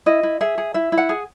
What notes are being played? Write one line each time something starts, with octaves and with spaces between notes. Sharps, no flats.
E4 D#5
E4
G#4 E5
G#4
E4 E5
E4
F#5
G#4